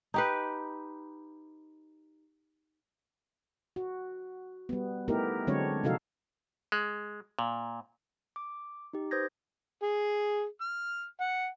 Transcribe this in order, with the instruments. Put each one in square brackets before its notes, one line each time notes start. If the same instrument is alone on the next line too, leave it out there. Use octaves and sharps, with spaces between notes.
[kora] D#4 G4 B4
[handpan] F#4
G3 B3
A3 B3 D#4 E4 G4 A#4
D3 F#3 G#3 C4 D4 C#5
C3 F3 D#4 F#4 A4 F5
[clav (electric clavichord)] G#3
A#2
[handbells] D6
D#4 G4
B4 C5 D#6 G6 G#6 A#6
[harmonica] G#4
F6
F#5